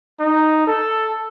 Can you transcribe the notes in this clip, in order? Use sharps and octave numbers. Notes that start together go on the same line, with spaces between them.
D#4
A4